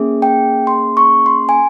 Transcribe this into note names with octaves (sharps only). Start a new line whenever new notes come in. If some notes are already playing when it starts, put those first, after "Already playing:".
Already playing: A#3 C#4 G#4
G5
C6
C#6
C6
G#5